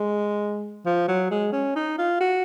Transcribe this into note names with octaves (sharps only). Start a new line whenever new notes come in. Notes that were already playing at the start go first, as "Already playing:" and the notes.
Already playing: G#3
F3
F#3
G#3
C#4
D#4
F4
F#4